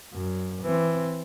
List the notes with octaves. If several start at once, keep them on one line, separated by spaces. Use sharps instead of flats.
F#2
E3 C4